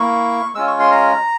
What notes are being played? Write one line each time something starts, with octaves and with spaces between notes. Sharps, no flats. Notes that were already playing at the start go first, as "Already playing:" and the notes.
Already playing: A#3 E4 C#6
G#3 C#4 F4 E6
C#6
C6
A#5